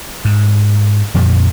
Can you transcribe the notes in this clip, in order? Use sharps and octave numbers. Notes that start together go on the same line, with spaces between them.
G#2
F2 A#2 F3 G3